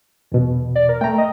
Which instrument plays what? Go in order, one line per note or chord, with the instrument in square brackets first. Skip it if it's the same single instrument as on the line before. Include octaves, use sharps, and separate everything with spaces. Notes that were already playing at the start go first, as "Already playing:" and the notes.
[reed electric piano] E2 B2
[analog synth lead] D5
A#4
[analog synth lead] A3 [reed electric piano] G5 A#5
[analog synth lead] D#5